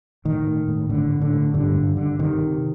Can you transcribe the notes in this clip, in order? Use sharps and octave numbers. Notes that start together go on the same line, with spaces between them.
A2 D#3
A2
A2
A2 D3
A2
D3
A2
G2 D3
G2
D3
C3 D#3
C3